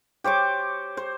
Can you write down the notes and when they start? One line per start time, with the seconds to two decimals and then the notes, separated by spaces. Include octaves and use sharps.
0.24 G4 C5 C#5 D6
0.97 C5